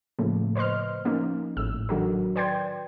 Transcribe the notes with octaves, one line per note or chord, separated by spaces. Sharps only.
A2 C#3 F3 A3 A#3
B4 C5 D#5 C6 F6
F3 A#3 C#4 D#4
G#1 A2 E6
D#3 F#3 D4 F#4 A4 A#4
B4 D5 G5 C6 G6 G#6